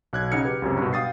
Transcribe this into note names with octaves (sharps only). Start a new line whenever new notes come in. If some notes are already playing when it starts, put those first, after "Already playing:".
B1 F#6 G#6
C#3 D#4 F#5 F6 G#6 C#7
G4 B4
C#2 F#2 C3
G2 B2
F5 G5 D#6 A6 C7